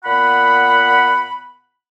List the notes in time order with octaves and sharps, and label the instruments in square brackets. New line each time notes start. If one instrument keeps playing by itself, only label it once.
[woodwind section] A#2 B3 F#5 B5